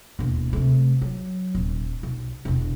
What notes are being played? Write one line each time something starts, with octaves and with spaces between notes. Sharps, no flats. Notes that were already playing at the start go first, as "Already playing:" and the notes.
E1 D#2
C3 A3
F#3
D#1
B1
E1 D3